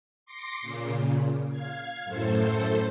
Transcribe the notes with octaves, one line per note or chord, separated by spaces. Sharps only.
C6 D6 A#6 C7 C#7
A#2 C#3
F5 G#6
F#2 A2 A4 C5